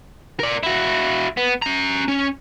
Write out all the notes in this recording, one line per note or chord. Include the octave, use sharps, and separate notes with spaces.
A#4 D5
E4 F#4
B3
C#4 A#5
C#4